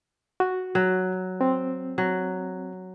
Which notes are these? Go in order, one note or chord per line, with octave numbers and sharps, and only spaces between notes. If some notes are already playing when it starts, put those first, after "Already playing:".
F#4
F#3
C4
F#3